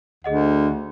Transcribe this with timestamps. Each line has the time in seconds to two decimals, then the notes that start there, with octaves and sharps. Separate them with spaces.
0.24 D2 G#4 D#5 F#5